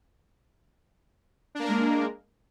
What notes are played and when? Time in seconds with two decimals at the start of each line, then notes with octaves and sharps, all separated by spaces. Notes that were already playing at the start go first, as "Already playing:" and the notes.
1.55 D4
1.59 A#3
1.64 A#4
1.69 G#3